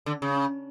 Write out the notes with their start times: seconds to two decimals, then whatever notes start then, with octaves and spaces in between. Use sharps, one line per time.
0.06 D3
0.22 C#3